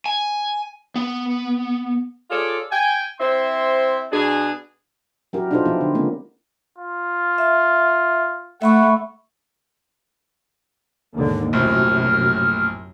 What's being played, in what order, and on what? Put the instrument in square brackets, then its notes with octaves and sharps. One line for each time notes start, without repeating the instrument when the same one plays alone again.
[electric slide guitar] G#5
B3
[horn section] F4 G#4 A4 C#5 D5
G5 G#5
C4 E4 C5 E5 C6
B2 D4 G#4
[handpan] F#3 C#4 E4 F#4 G4 A#4
D4 D#4 F4 G4 A4 C5
F3 B3 E4
D3
C#3 G#3 A#3 C4 C#4
[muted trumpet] F4
[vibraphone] E5
[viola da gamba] A3 [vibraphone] E5 B5 C#6 [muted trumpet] F#5
[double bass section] D#2 G#2 D3
[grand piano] A#1 A2 [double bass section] F#2 C3 [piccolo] F6